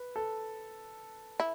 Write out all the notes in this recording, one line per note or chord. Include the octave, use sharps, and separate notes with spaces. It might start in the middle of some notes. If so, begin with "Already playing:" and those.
Already playing: B4
A4
E4